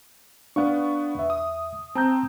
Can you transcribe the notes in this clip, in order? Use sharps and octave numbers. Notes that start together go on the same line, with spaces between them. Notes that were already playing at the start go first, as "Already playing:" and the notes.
B3 D4 F5 F#5 C#6
E2 E5
D#6
C4 A5 A#5 G6